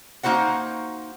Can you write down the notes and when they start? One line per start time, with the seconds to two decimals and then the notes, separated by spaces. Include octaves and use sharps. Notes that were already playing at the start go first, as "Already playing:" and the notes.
0.23 A#3 D#4 F#4 C5 F#5